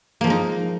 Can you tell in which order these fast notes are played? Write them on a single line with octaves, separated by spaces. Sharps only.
A#3 F3 G#3 D#4